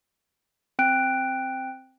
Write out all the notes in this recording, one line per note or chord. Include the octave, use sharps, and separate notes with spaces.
C4 G5 F#6 D7